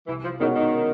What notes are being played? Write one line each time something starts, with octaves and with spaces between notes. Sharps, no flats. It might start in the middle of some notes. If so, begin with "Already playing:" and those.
C2 E3
F3
B2 D#3 G#3 C#4 F#4
D#3